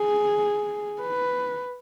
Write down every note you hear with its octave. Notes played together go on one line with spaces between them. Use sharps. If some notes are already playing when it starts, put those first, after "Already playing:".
Already playing: G#4
B4